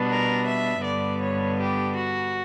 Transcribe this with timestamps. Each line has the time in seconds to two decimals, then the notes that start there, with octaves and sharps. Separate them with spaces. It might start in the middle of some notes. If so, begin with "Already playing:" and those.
Already playing: B2 G3 B3 D4
0.08 A#4
0.46 E5
0.83 G2 D3 G3 B3 D5
1.21 C#5
1.59 G4
1.96 F#4